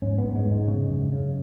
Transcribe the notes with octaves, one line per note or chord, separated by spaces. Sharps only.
G#2 C#4
B3
G#2
G#3
G#2
G#3
C#3
F#2
C#3